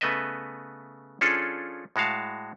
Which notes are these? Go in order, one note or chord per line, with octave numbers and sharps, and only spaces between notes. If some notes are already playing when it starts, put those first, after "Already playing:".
C#3 A3 B3 B4 D#5 E5
F3 C#4 D4 F4 G#4 A4
A2 G#3 F#4 F5 A5